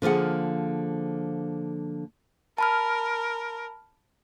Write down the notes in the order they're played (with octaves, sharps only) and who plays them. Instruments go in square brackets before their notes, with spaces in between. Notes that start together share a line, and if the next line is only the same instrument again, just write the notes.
[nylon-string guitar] D3 F3 A#3 G#4 F#5
[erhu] A#4 [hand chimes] A5 B5 F6